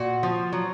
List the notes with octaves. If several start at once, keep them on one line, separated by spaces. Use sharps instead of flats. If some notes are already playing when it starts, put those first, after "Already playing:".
Already playing: A#2 F#4
F3
F#3